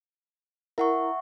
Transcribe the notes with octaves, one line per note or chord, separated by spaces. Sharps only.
E4 A#4 E5 F#5 C#6